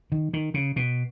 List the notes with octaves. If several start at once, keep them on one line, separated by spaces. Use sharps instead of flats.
D#3
D#3
C#3
B2